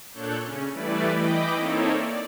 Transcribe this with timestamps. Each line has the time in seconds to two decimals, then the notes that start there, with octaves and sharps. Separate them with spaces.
0.14 A#2 D4 A4 C#5 F#6 G6
0.44 C#3 C#4
0.73 E3 G3 A3 E4 B4 D5
1.11 E3 D#5 G5 B5 D6
1.55 A#3 C4 D#4 E4 A4 C#5
1.91 D5